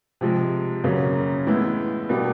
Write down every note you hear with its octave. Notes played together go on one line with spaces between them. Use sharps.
C3 F3 G#3
F#2 C#3 F#3 A#3 C#4
A2 E3 G#3 B3 E4
B2 G3 A#3 D4 G4